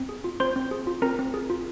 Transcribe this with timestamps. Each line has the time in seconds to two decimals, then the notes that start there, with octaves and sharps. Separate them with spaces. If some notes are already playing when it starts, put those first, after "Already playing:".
Already playing: C4
0.09 G#4
0.24 F4
0.40 C4 C5 C6
0.56 C4
0.71 G#4
0.87 F4
1.02 C4 A#4 A#5
1.19 C4
1.34 G#4
1.50 F4